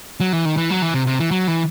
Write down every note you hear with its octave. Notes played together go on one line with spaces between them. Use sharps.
F#3
E3
D#3
E3
F#3
E3
C3
C3
E3
F#3
E3